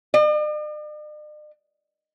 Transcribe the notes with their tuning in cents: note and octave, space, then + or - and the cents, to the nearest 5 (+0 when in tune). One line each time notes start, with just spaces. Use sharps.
D5 +45